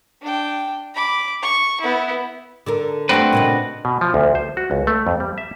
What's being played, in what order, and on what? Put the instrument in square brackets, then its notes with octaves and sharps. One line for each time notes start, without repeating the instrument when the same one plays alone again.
[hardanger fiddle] D4 G5
B5 D6
C#6
B3 E4
[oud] D3 A4 A#4
[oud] G3 A3 A4 [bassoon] C4 [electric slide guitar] D4 F#4 B4
[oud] A#2 C#3 D#5
[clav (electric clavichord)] B2
F3
D2
C5
F#4
C#2
A3
F2
G3
E5